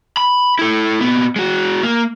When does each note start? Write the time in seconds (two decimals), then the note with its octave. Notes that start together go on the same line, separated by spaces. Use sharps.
0.17 B5
0.59 E4 A4
1.01 A#2 B3
1.36 G#3 F#4
1.83 A#3